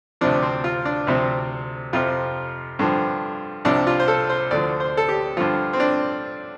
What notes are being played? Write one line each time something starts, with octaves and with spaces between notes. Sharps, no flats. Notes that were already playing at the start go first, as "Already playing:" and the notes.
D2 C3 F3 D4
C4
F4
D4
D2 C3 F3 C4
F2 C3 F3 F4
G2 D3 F3
C2 C3 F3 D4
F4
C5
A4
C5
D2 D3 F3 D5
C5
A4
G4
G2 D3 F3 F4
C4
D4